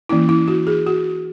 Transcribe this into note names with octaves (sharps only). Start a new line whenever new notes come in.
E3 A#3 C#4 E4
E4
F#4
G#4
F#4